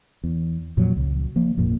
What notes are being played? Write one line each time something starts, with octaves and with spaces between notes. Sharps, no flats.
E2
F2 A#2 F3 F#3
C#2
F3 A#3
G#1 F2 A#2